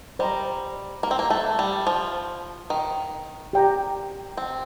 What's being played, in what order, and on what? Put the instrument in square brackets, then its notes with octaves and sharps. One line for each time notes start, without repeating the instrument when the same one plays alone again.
[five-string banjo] G3 [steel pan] C5 D#5 A#5
[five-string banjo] A#3
C4
A#3
A3
G3
F3
D#3
[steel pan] G4 D5 G5 A#5
[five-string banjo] C4